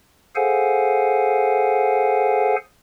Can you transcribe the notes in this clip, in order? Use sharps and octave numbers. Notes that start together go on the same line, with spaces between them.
G#4 A4 C5 F5 F#5 G#5